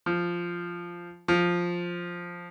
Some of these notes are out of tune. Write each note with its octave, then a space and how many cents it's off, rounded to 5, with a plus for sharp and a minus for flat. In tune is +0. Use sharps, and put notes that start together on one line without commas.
F3 -5
F3 +5